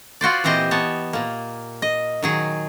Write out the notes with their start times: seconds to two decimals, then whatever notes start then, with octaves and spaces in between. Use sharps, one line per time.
0.21 F4 F#4 C5 D5
0.44 A#2 E3 C4 G4 C5 D#5
0.71 B3 C#5 A5
1.13 A#2 A#3
1.82 D#5
2.23 D#3 F#3 G#4